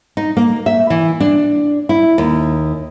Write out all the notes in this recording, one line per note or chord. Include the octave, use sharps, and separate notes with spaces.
D#4
A#3
E5
E3
D4
E4
D#2